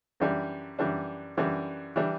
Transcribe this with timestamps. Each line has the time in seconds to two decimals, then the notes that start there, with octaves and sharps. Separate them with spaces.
0.20 F#2 E3 G3 D4
0.79 F#2 E3 G3 D4
1.37 F#2 E3 G3 D4
1.96 E3 G3 D4